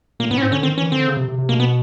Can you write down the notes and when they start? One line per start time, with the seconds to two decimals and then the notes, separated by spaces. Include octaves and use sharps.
0.20 A#2 A#3
0.31 A2 B3
0.38 C#4
0.42 G#2 C4
0.52 D3 C#4
0.63 D#3 C4
0.77 E3 C#4
0.92 D3 C4
1.07 C#3
1.17 C3
1.28 C3
1.38 C3
1.49 B2 A#3
1.60 B3